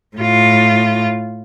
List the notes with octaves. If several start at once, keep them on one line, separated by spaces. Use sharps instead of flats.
A2 F4